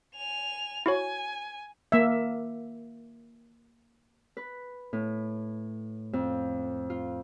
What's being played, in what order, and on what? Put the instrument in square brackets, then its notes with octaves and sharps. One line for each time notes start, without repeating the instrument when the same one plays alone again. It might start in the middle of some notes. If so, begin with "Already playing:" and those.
[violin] G#5 F7
[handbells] E4 F#4 C#5 [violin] G#5
[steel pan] A#3 E5
[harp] B4
A2
F2
F4